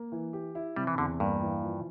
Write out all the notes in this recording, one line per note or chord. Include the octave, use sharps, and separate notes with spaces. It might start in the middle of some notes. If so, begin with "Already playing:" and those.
Already playing: A#3
E3
G4
E4
C3 G3
E3
E2 D3
G2 A#3
E3
F3